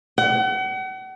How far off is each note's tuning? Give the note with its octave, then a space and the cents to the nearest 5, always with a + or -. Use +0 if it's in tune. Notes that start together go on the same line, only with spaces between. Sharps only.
F#5 +40